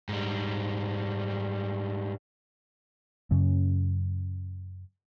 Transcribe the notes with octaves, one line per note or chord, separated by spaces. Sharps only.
G#2 G3
F#2 C#3